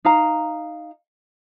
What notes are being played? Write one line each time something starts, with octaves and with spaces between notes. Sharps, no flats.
D#4 F5 A#5